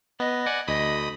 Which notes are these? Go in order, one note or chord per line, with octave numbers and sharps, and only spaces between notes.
B3 D#5
D5 F#5 G#5
D2 D#5 B5 D#6